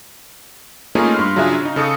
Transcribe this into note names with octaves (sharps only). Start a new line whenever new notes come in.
A3 A#3 C#4 D#4 F4 G#4
G2 C6 F6
C#3 F#3 D4 F4 G#4 E5
C#3 D#4
C#3 A4 D#6 C#7